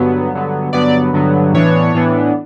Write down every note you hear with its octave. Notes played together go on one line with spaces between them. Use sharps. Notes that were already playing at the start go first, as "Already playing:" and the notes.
Already playing: G2 D3 F#3 B3
G2 D3 F#3 B3
G2 D3 F#3 B3 D5
G2 D3 F#3 B3
A2 E3 B3 D4 C#5
A2 E3 B3 D4